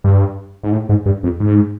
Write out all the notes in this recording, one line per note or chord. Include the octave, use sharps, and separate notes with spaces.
G2
G#2
A2
G#2
G2
F2
G#2